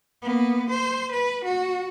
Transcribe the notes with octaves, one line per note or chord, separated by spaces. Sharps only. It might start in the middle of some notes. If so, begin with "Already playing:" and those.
A#3 B3
C5
B4
F#4